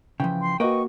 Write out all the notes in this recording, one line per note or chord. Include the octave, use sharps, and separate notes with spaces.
C#3 E3 F3 G5
C6
A#3 F#4 B4 D#5 G5 C#6